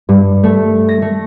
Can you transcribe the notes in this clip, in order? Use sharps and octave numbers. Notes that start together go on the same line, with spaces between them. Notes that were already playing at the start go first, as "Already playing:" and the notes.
G2
A3
A#6
A3